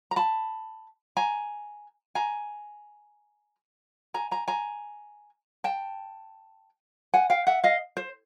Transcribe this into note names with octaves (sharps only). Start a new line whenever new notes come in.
A#5
A5 B5
G#5 A#5
G#5 A#5
G#5 A#5
G#5 A#5
G#5 A#5
G5 A5
F#5 G#5
F5 G5
E5 F#5
D#5 F5
C5